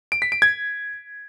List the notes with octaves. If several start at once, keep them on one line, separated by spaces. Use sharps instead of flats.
D7
B6
D7
G#6